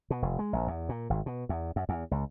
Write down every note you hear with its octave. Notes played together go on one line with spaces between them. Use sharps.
B2
F1
G#3
A#1
E2
A#2
G#1
B2
E2
F#2
E2
C#2